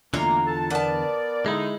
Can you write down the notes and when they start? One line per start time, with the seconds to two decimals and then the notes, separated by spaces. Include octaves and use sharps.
0.14 E2 D3 A3 A#3 F4 A#5
0.47 A4 A5
0.70 B3 A#4 D5 A5
1.46 D3 G#3 D#4 E4